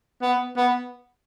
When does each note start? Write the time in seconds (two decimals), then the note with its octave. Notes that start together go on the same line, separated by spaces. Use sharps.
0.22 B3
0.57 B3